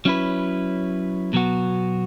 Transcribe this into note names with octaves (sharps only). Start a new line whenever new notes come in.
F#3 C#4 E4 B4
B2 F#3 B3 F#4